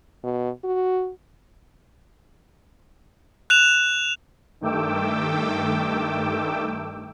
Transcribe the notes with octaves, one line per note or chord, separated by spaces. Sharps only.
B2
F#4
F#6 E7 F7
G2 D#3 A3 G5 D6 E6